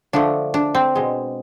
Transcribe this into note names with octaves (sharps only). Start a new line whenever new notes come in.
D3 F3 A3 D4
D4
C4
B2 G#3